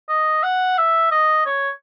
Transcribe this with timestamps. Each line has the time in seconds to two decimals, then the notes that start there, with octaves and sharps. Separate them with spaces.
0.09 D#5
0.43 F#5
0.78 E5
1.11 D#5
1.46 C#5